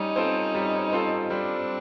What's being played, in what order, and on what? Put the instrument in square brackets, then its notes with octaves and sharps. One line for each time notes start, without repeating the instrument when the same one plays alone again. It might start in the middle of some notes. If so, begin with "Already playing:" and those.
Already playing: [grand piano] G3 [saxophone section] C#4 D#4
[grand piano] C4 F4 A4 C5
G3
C4 F4 A4 C5
[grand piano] G3 [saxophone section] C4 D4